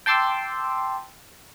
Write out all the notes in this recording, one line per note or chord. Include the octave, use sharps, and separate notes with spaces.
G5 A5 C6 D6 E6